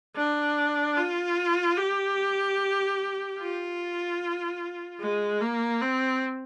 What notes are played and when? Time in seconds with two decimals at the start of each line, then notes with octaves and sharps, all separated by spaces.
0.16 D4
0.97 F4
1.77 G4
3.39 F4
5.00 G#3
5.41 A#3
5.81 C4